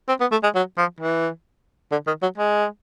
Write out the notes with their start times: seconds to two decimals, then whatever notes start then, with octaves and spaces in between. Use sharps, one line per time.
0.08 C4
0.21 B3
0.32 A3
0.43 G#3
0.55 F#3
0.78 F3
1.00 E3
1.92 D3
2.07 D#3
2.22 F#3
2.38 G#3